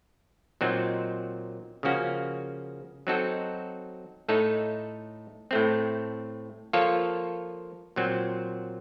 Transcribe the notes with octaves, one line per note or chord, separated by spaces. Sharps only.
A#2 F#3 C4 D#4
C#3 F3 A#3 C#4 F#4
F#3 C4 D#4 F#4 A4
A2 A3 D#4 A4 C#5
A2 A3 C4
F3 A#3 F4 A4 C#5
A#2 F#3 C4